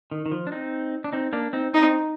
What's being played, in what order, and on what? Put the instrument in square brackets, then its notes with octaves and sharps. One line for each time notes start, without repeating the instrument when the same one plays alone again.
[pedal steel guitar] D#3
D#3
F3
D4
C4 D#4
D4
C4 D#4
A#3 D4
C4 D#4
[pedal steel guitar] C4 [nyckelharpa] D#4